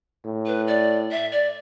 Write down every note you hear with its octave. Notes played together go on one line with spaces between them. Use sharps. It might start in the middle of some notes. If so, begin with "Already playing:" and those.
A2
B4
D5
E5
D5